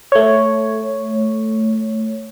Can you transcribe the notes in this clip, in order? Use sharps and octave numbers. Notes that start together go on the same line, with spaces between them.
A3 C#5